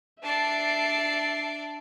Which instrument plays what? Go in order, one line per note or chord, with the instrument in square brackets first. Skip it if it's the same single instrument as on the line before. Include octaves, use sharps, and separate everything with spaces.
[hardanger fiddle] D4 D5 [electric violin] E5 C7 [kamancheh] A5